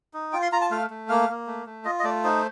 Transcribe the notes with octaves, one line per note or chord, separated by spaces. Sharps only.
D#4
F4 G5
C6
F4 A#5
A5
A3 F5
A3
A#3 F5
A#3
A3
A3
F4 D#5
D#5
A3 D5
D#4 C5